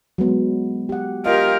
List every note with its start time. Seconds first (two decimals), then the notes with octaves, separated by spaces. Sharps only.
0.18 F#3 G#3 B3
0.89 G4 F#5
1.26 F4 G4 A#4 D#5